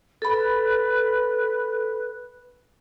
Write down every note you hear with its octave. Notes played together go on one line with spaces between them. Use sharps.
A4 B4 B5